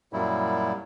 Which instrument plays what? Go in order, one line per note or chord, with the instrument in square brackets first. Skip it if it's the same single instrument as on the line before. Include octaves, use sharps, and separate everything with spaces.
[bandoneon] F#2 A#2 F#3 G3 E4